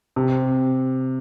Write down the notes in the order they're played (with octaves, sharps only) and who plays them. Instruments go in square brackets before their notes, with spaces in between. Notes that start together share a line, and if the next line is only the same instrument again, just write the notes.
[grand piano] C3